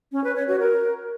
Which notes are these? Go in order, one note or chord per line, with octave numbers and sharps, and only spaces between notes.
C#4
B4
C#5
F#4
A#4